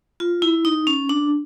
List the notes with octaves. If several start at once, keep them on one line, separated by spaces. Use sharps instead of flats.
F4
E4
D#4
C#4
D4